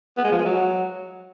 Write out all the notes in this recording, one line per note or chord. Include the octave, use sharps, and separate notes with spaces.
B3
G#3
F3
G#3
F#3